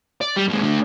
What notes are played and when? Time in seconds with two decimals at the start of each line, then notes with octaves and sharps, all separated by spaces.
0.21 D5
0.36 G3
0.48 D#2 G#3
0.63 A3 D4